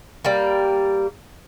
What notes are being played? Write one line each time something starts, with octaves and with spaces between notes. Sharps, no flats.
G3 A#3